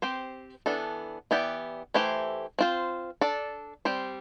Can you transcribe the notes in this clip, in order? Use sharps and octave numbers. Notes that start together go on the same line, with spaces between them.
C4 G4 C5
E3 B3 D4 A4
E3 B3 E4 G4 D5
E3 A3 E4 G4 C5
C4 F4 C5
D4 A4 D5
G3 C4 G4 C5